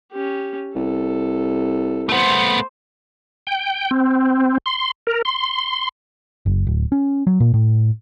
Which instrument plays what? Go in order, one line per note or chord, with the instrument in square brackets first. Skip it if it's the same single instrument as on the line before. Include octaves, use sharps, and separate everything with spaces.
[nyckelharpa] C#4 G4
[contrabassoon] C2 [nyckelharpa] A4
[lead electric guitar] A3 B3 [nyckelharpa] C5 C6
[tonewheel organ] G5
C4
C6
A#4
C6
[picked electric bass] F#1
D1
C#4
F#3
A#2
A2